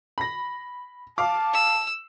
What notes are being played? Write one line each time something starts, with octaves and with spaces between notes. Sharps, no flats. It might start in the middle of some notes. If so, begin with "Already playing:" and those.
B5 A#6
F5 A5 D6
E6